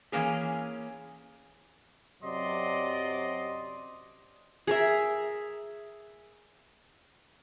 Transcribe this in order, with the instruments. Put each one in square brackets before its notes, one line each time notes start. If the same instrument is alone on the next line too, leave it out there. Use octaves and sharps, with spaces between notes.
[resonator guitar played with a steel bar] E3 F3 A#3 C#4 G#4
[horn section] F#2 C3 F#3 D5 D#5 C6
[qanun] G#4 A#4 E5